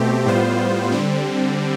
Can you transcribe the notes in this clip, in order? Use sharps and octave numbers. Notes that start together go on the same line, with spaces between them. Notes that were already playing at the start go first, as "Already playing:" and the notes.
Already playing: B2 A3 C4 G4
A2 G3 B3 F4 C5
D3 G3 C4